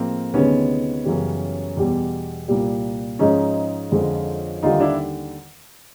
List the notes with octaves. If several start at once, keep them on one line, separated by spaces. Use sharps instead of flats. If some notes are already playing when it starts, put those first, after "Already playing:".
Already playing: A2 F3 G#3 A#3 C4
D2 C3 D#3 G#3 B3 C#4
F#2 C#3 E3 G3
E2 B2 G3
C2 A#2 G3
G#2 F3 G#3 C#4 D#4
F2 D3 F3 G#3
D#2 D3 G3 D#4 F4
D4 E4